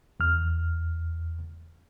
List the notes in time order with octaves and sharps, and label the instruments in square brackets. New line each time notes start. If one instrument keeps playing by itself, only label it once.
[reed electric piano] E2 F6